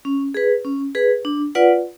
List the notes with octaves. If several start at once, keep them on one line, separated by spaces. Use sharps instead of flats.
C#4
G#4 B4
C#4
G#4 B4
D4
F4 B4 D5 F#5